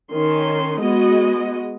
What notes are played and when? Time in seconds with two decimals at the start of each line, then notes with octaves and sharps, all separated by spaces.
0.11 D#3 C#4 C6
0.80 G#3 B3 F#4 D#5